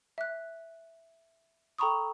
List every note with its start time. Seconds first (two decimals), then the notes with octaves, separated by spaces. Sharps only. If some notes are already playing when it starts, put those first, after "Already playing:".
0.18 E5 F#6
1.78 A4 G5 A#5 B5 C#6 D#6